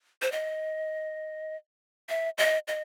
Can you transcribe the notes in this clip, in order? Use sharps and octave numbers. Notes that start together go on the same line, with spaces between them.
C5
D#5
E5
D#5
D#5